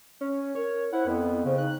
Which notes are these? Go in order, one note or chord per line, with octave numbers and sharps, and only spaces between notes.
C#4
A#4 C#5
E4 C5 F#5
F2 B3 E4
C#3 C5
D#4 F#6